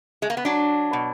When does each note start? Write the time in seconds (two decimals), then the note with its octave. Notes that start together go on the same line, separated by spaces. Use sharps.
0.22 G#3
0.30 A#3
0.37 B3
0.45 F#3 D4
0.93 B2